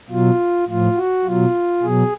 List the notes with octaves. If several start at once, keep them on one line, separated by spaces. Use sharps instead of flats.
B2 F#3 F4
A2 F3 F4
F#4
B2 F#3 F4
B2 F#3 G#4